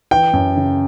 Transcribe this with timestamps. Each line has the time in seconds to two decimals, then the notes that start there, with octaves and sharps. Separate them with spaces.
0.11 E3 G5
0.33 F#2
0.57 C#3